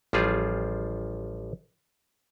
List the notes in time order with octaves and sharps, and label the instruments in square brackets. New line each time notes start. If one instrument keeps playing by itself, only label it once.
[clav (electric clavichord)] A1 F3 G3 F4 G#4